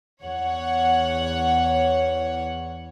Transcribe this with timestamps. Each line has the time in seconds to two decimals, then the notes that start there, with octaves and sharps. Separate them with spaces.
0.22 E2 C#5 F#5